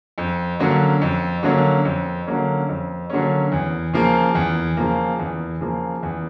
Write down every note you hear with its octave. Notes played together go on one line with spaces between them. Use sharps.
F2
D3 F#3 A#3 C#4
F2
D3 F#3 A#3 C#4
F2
D3 F#3 A#3 C#4
F2
D3 F#3 A#3 C#4
E2
C#3 F3 A#3
E2
C#3 F3 A#3
E2
C#3 F3 A#3
E2